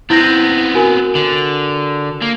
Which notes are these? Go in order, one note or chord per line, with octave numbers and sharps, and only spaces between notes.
B3 C4 E4 G6 A#6
F#4 A#4 G#5
D3
A#3